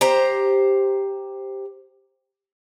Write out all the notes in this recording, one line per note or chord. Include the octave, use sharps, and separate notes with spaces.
G4 C5 A#5